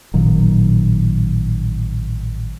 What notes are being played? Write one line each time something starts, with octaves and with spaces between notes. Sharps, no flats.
A1 A#2 D#3 F#3